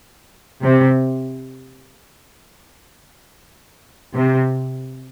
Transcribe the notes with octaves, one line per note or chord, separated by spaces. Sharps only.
C3
C3